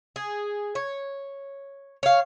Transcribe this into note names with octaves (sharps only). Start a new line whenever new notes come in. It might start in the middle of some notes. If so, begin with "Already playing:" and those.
G#4
C#5
C#5 F5